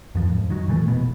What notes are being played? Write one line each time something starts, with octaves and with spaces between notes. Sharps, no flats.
F#2 F3
F2 G#2
D#3 F#3
A#2 E3 G3 A3
F1 B2 B3